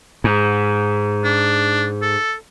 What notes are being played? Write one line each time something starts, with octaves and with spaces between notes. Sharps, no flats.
G#2
D4
A4